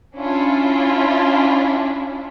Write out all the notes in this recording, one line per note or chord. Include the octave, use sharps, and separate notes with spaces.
C#4 D4 E4 F4